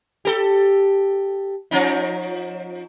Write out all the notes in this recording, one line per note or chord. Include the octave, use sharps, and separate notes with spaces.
G4 A4
F3 C#4 D#4